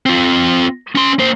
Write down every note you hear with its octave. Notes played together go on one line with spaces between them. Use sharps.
C4 F4
C#4 C6
A#3 C5